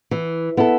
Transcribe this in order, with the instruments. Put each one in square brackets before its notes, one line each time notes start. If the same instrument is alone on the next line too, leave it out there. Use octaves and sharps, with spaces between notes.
[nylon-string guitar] E3
B3 E4 A4